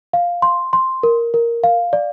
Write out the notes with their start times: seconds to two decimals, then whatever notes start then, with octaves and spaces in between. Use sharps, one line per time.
0.13 F5
0.42 C6
0.73 C6
1.03 A#4
1.34 A#4
1.64 F5
1.93 D5